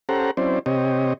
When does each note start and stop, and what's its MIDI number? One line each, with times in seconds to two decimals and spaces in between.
0.09 0.31 61
0.09 0.31 67
0.09 0.31 69
0.09 0.31 72
0.09 0.31 78
0.09 0.31 82
0.37 0.59 54
0.37 0.59 60
0.37 0.59 61
0.37 0.59 64
0.37 0.59 72
0.37 0.59 74
0.66 1.13 48
0.66 1.13 60
0.66 1.13 67
0.66 1.13 73
0.66 1.13 75